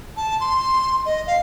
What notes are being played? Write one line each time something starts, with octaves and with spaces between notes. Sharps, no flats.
A5
C6
D#5
F5